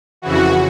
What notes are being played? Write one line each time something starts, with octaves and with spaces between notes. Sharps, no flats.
F2 C#3 E3 F#4